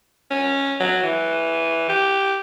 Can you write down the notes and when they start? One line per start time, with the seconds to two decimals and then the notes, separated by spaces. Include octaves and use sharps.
0.31 C#4
0.80 F#3
1.03 E3
1.89 G4